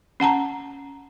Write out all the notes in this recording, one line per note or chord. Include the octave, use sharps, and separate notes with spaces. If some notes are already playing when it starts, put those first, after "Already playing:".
C#4 F#5 A5 A#5